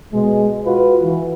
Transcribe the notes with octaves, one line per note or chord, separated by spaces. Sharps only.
B2 G#3
F4 F#4 B4
E3